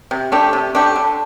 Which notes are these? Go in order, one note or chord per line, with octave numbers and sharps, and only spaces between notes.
C3
A3 D4 G4
C3
A3 D4 G4
D3